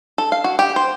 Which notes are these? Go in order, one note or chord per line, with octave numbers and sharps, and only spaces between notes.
A4
F5
F#4
G4
C5